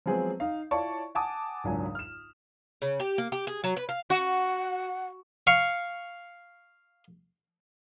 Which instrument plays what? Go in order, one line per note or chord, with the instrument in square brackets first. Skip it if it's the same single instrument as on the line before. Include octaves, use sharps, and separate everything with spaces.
[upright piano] F3 F#3 G#3 B3 C4 G#4
D#4 F5
E4 F4 C#5 D5 A5 C#6
F#5 G#5 A5 D6 D#6
G#1 C#2 F#3 D4 G#5
F6 E7
[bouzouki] C#3
G4
A#3
G4
G#4
F#3
B4
F5
[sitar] F#4 [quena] F#5
[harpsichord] F5 C#6